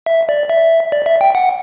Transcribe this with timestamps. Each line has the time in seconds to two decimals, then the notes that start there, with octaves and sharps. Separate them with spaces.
0.06 E5
0.29 D5
0.50 E5
0.92 D5
1.06 E5
1.21 G5
1.35 F#5